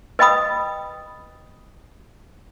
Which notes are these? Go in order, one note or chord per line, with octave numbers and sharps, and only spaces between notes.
B4 D#5 G5 B5 D#6